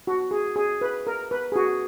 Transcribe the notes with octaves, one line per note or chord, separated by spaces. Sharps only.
F#4
G#4
G#4
B4
A#4
B4
G#4
F#4